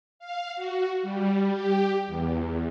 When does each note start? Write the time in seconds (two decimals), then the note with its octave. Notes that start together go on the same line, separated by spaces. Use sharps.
0.19 F5
0.56 F#4
1.02 G3
1.50 G4
2.07 E2